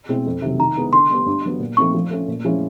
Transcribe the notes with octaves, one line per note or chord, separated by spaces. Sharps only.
B2 G#3 C4 E4
F2
C3 D#3 F#3
D#3 A#5
G#3 B3 E4
D3 C6
G3 B3
G2
D3 F#3 B3
A#2
F3 A3 C4 D#4 C#6
F3
A3 C#4
A#2
F3 G#3 C#4 E4